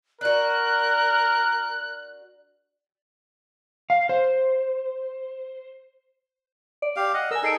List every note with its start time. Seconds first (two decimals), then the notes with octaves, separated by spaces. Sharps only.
0.21 D4 F#4 A#4 F#6
3.90 F5
4.09 C5
6.82 D5
6.96 G4 F5
7.14 D#5 F#5
7.31 A#4 G#5 E6
7.43 D#4 G#4 A4 E6 C7 D7